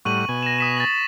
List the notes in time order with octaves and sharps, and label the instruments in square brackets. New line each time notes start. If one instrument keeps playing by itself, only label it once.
[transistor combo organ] A2 G3 F#5 [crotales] C#6 D#7 F#7
[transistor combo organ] B2 G#5
[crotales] A#6 E7
D#6 B6 E7
A6 A#6 F#7